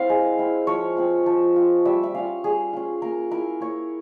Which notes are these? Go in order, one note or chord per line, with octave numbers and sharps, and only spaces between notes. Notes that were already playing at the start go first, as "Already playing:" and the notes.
Already playing: C4 E4 F5
G#3
C4 E4
F3 C#5
C4 F4
F3
C4 F4
G3 E5
E5
C#4 F4 F5
G3 G#4
C#4 F4
A#3 A#4
E4 A#4
A#3 C#5